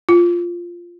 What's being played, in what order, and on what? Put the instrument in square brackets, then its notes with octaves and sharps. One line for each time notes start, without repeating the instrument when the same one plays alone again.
[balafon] F4